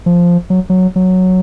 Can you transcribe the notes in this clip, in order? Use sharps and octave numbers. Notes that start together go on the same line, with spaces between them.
F3
F#3
F#3
F#3